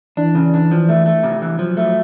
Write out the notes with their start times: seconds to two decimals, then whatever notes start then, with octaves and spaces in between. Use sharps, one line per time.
0.17 E3 D4
0.35 C#3
0.54 D4
0.71 F3
0.89 A3
1.06 A3
1.23 C3
1.42 E3
1.59 F3 F#3
1.77 A3